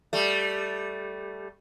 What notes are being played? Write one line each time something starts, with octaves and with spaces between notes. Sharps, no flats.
G3 A3